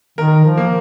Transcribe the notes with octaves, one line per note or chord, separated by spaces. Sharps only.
D#3 A#4
F3
A#3